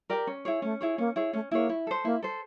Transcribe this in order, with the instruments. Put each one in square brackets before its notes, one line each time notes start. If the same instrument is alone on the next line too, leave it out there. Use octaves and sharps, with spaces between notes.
[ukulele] G4 A#4 D5
C#4
E4 G#4 C#5
[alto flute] A3 [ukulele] C#4
[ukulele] E4 G#4 C#5
[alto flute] A#3 [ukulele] C#4
[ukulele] E4 G#4 C#5
[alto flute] A3 [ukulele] C#4
[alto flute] A#3 [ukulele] E4 G#4 C#5
[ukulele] E4
A4 C5
[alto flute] A#3 [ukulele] E4
[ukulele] A4 C5